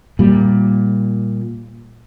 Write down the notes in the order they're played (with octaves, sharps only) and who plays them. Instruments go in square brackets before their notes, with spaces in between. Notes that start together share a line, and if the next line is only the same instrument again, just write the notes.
[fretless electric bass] A#2 G3